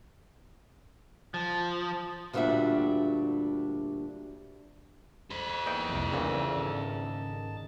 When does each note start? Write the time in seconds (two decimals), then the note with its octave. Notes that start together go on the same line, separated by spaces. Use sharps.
1.34 F3
2.33 D2 A#2 G3 D4 F#4 E5
5.30 A4 C5 B5
5.66 E2 A#3 D#4 E4 G5
5.89 C2 F2
6.13 A#1 E2 A#2 C#3
6.57 G#2 D#3 A5